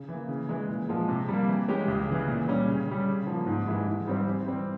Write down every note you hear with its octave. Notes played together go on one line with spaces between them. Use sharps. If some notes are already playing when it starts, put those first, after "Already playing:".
Already playing: C#3
E3 A#3
C#3
E3 G#3
A#2
F3 G#3
C3
G3 A#3
E3
G#3 C#4 G4
C#2
C#3 E3
A#2
G3 C#4
C#3
G3 C#4
C#3
F3 A#3
G#2
E3 G#3 E4 G4
G#2
G3 C4 G4 C5
E3
G3 C4